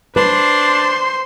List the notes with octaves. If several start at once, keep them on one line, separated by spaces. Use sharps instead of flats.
D4 B4 C5 C6